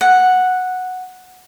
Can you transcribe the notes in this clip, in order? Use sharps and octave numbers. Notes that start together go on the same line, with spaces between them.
F#5